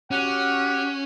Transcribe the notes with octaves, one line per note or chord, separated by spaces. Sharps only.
C#4 F#4 G4 F#5